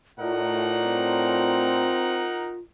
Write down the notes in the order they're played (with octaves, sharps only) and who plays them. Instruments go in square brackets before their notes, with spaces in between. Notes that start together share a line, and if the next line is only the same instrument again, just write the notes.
[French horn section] A2 D5 [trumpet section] D#4 A#4 F#5 [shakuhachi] F4
[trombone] C4